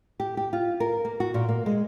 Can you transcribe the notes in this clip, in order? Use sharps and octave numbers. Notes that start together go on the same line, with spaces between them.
G4
G4
F4
A#4
A#3
F#4
A#2
A#3
G#3